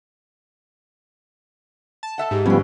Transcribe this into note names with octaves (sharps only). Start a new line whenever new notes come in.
A5
A4 E5 F#5
G#2 G4
D3 F3 G3 B3 C#4